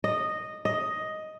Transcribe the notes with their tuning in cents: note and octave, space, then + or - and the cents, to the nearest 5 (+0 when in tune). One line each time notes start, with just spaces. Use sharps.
D#5 -10
D#5 +5